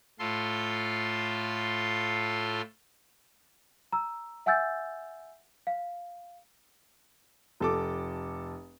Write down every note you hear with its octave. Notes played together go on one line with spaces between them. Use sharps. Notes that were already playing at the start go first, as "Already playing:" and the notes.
A2 F4 A4 C6
A#5 E6
E5 F#5 G#5 E6 G6 A6
F5
F1 A4 D6